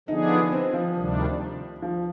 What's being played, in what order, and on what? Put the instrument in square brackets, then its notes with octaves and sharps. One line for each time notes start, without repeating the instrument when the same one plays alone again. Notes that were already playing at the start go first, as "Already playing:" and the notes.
[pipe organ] D3 F3 B3 D4 G#4 [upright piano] D#4
[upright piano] C4
F3
[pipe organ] D2 C3 D#3 G3 D4
[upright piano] F3